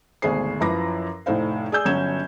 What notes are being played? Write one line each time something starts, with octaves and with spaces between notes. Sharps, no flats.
G#1 D2 B2 G#4 C5 C7
F#2 F3 E4 B4 D6 A#6
F1 A2 D#4 C5 F5
G#4 D5 G#5 E6 G6
G1 F#3 C#4 G#6 E7